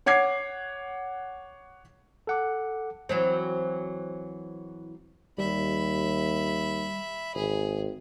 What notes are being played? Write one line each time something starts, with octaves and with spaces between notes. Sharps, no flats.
C#5 F#5 D6 G#6 C7
A4 F#5 D6
E3 F#3 C4
D#2 G3 E5 B5
G#1 G#4